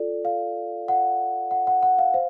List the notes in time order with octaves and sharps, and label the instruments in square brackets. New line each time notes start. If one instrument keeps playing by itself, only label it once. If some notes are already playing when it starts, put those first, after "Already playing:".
Already playing: [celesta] F4 A4 D5
F5
F#5
F#5
F#5
F#5
F5
C5 F5